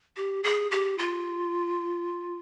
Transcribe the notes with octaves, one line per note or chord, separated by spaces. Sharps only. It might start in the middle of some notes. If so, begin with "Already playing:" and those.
G4
G#4
G4
F4